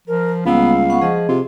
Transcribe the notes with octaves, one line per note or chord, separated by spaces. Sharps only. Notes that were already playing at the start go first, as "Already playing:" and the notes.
F3 A#4
C#2 G3 A#3 B3 F5 E6
B3 C#4 F#5 C#6
F3 G#4 D#5
C3 F4